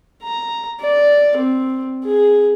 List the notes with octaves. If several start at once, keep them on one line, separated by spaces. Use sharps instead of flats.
A#5
D5
C4
G#4